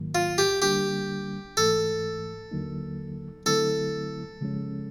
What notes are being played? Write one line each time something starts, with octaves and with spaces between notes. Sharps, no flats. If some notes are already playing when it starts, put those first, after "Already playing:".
Already playing: G#2 D#3 F#3 A#3
F4
G4
D3 G3 A#3 D4 G4
G#2 E3 A3 A4
D#2 D3 F#3 A#3 D#4
D3 F#3 A3 C4 E4 A4
C#3 F3 G#3 C#4